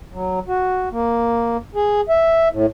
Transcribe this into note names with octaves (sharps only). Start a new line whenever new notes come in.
F#3
F#4
A#3
G#4
E5
A2